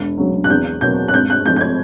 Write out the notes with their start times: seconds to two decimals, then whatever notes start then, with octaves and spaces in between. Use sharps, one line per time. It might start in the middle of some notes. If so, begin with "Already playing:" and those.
Already playing: E1
0.18 D2 C#3 F#3
0.44 F#6
0.50 E2 G6
0.81 B2 F#3 A#3 G6
1.08 F#6
1.14 G#1 G6
1.30 F#6
1.45 G#2 F3 A3 G6
1.56 G6
1.61 G#6